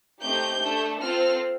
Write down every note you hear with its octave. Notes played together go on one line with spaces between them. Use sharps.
A3 C4 D#4 G4 G6
A3 D4 A4
C4 F4 A4 F6